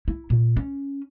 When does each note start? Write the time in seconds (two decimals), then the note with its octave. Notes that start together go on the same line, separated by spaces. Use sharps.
0.08 E4
0.30 A#2
0.57 C#4